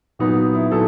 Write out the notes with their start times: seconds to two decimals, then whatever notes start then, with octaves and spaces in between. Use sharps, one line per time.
0.19 A#2 F#3 B3 D#4
0.55 E4
0.72 A#2 F#3 B3 D#4 A4